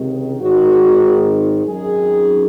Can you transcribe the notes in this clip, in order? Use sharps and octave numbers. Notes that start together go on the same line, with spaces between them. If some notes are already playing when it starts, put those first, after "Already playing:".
Already playing: C#2 C3 D#3
G#1 G#2 D#3 F#4
G#1 F#2 D#3 G#4